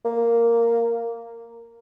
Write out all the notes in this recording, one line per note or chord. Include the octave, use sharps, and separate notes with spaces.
A#3